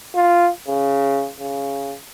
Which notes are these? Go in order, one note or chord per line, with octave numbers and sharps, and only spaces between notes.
F4
C#3
C#3